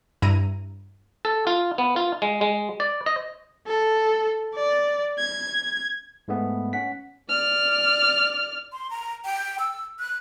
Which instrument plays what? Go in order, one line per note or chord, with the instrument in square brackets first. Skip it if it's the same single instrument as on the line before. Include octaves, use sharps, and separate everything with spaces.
[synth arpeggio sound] G2 E4 A#5 D#7
[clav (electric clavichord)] A4
F4
B3
F4
G#3
G#3
D5
D#5
[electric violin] A4
D5
G#6
[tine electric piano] G#2 G#3 A3 B3
C#4 F#5 B6
[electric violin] D5 F6
[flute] C6
A#5
G5
E6
F#6